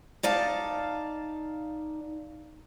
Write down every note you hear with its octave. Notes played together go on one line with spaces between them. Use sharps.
D#4 D5 F5 A5